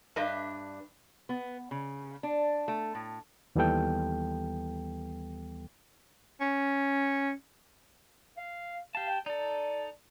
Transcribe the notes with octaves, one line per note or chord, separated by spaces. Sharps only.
G2 D4 B4 D#5 E5
B3
C#3
D4
A3
A2
D#2 E3 G3 B3 A4 G5
C#4
F5
G4 F5 A5
G5
D#4 A4 D5